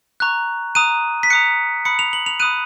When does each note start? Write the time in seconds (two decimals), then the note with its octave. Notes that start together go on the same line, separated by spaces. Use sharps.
0.20 A#5 C#6 F#6
0.75 A#5 D#6 F#6 D#7
1.23 B6
1.30 A#5 D#6 F#6 C#7
1.85 B5 D#6 F#6 C#7
1.99 F7
2.13 F#7
2.26 F7
2.40 B5 D#6 F#6 D#7